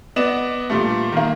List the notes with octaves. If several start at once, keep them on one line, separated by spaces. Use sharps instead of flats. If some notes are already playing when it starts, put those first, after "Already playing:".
B3 D5 D#5 E7
A#2 G3 A3
D#3 A#3